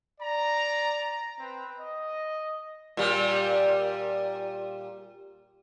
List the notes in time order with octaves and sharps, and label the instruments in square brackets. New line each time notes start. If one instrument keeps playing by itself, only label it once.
[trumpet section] D5 A#5
C4 B4
D#5
[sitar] A#2 G3